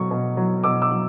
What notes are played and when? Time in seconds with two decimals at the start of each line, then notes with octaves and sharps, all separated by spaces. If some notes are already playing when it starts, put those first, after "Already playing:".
Already playing: B2 F#3 C#6
0.11 B2
0.37 F#3
0.64 B2 D6 E6
0.82 D6 E6
0.91 F#3